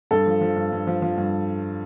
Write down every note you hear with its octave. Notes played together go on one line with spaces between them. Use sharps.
G2 A4
F3
F3
G2
G2
F3
F3
G2